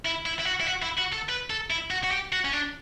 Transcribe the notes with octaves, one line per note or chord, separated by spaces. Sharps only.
E4
E4
E4
F#4
E4
F#4
E4
F#4
A4
B4
A4
E4
F#4
F#4
G4
F#4
C#4
D4